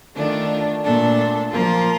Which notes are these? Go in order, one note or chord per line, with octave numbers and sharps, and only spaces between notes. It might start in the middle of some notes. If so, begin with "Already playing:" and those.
D#3 A3 D4 F4
A#2 A3 D4 A4
F3 A#3 F4 A#4